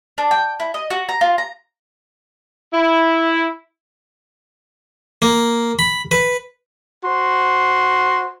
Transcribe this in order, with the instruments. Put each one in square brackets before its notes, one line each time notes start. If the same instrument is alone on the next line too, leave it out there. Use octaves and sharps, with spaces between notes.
[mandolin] D4
G5
E4
D#5
F#4
A#5
F4
A#5
[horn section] E4
[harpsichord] A#3
B5
B4
[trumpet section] F#4 C5 C6